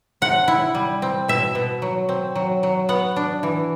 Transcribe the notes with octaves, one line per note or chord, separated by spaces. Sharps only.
C3 F#5
E4
G3
C4
B2 E5
B2
F#3
C4
F#3
F#3
B3 F#5
D4
E3